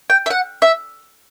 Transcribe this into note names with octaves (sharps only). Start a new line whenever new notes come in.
G5
E5
F#5
E5